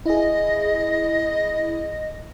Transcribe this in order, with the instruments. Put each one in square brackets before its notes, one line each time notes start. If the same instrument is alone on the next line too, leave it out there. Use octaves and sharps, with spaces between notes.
[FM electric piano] E4 G#4 [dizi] D#5